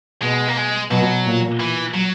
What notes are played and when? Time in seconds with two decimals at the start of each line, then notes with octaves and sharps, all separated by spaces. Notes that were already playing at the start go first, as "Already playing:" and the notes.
0.22 B2 G#3
0.48 A#3
0.57 G#3
0.90 B2 F#3
1.26 A#2
1.60 E3
1.94 F#3